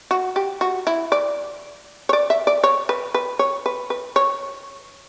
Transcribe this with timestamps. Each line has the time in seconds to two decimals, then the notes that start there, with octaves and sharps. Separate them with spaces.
0.11 F#4
0.36 G4
0.61 F#4
0.87 E4
1.12 D5
2.09 C#5
2.13 D5
2.30 E5
2.47 D5
2.64 C#5
2.89 B4
3.14 B4
3.39 C#5
3.66 B4
3.90 B4
4.16 C#5